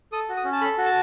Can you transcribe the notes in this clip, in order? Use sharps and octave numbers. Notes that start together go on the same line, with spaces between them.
A4 D#6
F#4
D#6
C#4
A5
A4 B5
F#4
A5